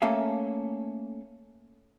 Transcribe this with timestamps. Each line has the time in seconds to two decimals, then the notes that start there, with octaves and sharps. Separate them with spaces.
0.02 A3 A#3 C#4 A4 E5 F5